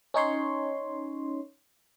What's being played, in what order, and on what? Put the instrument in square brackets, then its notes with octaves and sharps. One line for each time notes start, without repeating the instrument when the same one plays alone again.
[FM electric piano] C#4 D#4 C#5 C6